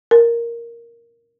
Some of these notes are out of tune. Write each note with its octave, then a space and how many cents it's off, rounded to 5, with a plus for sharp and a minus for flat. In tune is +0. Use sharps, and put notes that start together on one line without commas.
A#4 +0